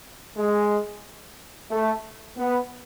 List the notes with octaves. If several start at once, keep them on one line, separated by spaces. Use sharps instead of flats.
G#3
A3
B3